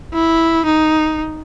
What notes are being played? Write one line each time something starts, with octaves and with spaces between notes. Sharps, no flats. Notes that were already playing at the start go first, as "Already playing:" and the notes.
E4
D#4